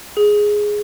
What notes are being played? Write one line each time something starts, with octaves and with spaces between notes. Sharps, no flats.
G#4